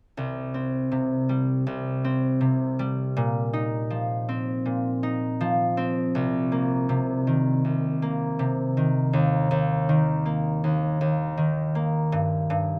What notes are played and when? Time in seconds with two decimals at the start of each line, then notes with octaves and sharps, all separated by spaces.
0.17 C2
0.54 C4
0.92 C3
1.29 G3
1.67 C2
2.04 C4
2.41 C3
2.79 G3
3.17 A#2
3.53 D#4
3.90 F3
4.29 C4
4.65 A#2
5.03 D#4
5.41 F3
5.77 C4
6.15 C2
6.52 A#3
6.89 C3
7.27 D#3
7.65 C2
8.02 A#3
8.39 C3
8.77 D#3
9.13 D#2
9.51 D#2
9.89 D#3
10.26 A#3
10.64 D#2
11.01 D#2
11.37 D#3
11.75 A#3
12.12 G2
12.50 G2